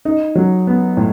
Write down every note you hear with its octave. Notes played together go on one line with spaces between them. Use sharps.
D#4
F#3
B3
A2